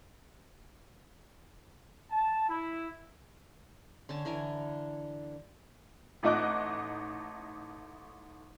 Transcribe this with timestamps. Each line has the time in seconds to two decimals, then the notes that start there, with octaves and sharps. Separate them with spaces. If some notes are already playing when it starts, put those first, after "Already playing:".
2.11 A5
2.48 E4
4.09 D3 C#4 A5
4.25 D3 E3 A#4 G#5
6.23 A1 A3 D#4 D#5 D6 F#6